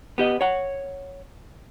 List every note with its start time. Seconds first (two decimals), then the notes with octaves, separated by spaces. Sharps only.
0.18 B3 G4 D#5
0.41 C#5 F#5